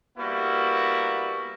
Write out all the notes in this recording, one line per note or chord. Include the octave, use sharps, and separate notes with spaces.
G3 A#3 B3 E4 F#4